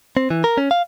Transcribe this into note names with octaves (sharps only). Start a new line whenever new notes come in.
C4
E3
A#4
C#4
F5